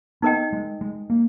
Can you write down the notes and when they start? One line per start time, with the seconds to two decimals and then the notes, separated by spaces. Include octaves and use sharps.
0.22 B3 D#4 A#4 D#5 G5
0.53 G#3
0.81 G#3
1.10 A#3